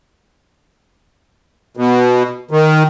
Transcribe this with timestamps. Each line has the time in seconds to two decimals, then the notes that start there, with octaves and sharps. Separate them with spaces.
1.77 B2
2.51 D#3